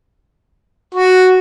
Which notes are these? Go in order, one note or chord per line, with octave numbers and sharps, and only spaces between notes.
F#4